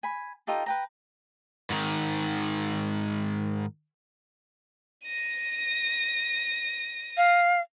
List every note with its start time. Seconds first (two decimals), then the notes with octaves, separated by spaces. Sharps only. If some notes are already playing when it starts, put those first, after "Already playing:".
0.03 G#5 B5
0.47 D#4 F4 G4 A4
0.66 B4 G5 A#5
1.70 G#2 D#3
5.04 A#6 D#7
7.17 F5